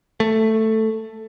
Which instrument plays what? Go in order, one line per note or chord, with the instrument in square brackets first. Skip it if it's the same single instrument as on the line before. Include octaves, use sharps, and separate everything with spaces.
[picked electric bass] A3